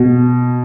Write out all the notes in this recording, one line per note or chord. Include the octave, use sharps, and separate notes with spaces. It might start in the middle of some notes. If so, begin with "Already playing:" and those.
Already playing: B2